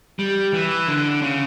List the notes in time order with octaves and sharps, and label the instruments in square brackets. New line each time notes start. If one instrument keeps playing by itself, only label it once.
[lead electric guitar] G3
E3
D3
C#3